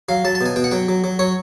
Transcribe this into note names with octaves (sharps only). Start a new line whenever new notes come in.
F#3 F5
F#3 A5
A5
B2 G#5
B2 G5
F#5
F#3 G5
F#3
F#3
F#3 C#5